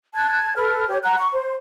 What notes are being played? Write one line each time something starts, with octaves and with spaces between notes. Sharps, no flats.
A5 F#6 G#6
A4 B4 F6
G4 C#5
F#5 A#5 F#6
C#6
C5